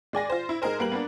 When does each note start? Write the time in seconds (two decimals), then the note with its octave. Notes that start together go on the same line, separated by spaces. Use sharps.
0.13 G#3 D5 G#5 A#6
0.30 F4 C5
0.49 E4
0.62 G#3 D#4 G#4 A#4 C5
0.79 G3 A#3 B4 F#7
0.92 A#3 B3 D4